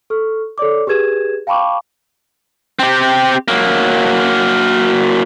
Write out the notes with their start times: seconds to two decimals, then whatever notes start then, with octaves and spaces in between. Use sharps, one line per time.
0.10 A4 C#6 F6
0.58 A4 C#5 D5 D6
0.87 G4 G#4 B4 G#6 E7
1.47 F5 G5 A5 B5 C#6 D6
2.79 C4 G4
3.48 F#3 A#3